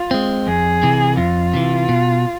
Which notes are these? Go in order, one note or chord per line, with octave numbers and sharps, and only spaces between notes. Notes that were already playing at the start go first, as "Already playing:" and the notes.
Already playing: F4
G#3 C4
F2 G#4
C3 E3
F2 F4
C3 E3
B2